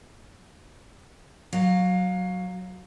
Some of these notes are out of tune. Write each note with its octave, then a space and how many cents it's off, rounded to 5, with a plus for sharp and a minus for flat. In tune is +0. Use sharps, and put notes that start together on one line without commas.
F#3 +0 F5 +25